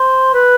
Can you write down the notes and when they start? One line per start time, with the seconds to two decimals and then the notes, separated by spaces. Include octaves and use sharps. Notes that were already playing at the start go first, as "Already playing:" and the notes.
Already playing: C5
0.34 B4